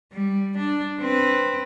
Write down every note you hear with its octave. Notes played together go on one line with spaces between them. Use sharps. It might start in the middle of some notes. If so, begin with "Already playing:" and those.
G3
D4
C4 B4